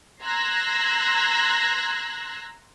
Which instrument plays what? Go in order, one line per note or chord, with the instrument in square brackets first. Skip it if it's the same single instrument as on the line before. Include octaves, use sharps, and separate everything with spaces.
[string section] A#5 C6 E6 F#6 G#6 A#6